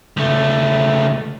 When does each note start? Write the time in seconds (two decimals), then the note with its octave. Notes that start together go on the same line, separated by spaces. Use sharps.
0.17 C#2 A3